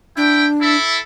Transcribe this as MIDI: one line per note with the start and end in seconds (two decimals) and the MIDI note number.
0.17 0.76 62
0.17 0.46 64
0.17 0.46 79
0.61 0.99 64
0.61 0.99 69
0.61 0.99 76